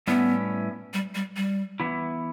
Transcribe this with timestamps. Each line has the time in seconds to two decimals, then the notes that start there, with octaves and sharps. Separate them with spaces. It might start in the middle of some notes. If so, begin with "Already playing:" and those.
0.07 A2 G3 B3 C#4 E4 B4
0.94 G3
1.15 G3
1.36 G3
1.80 E3 B3 E4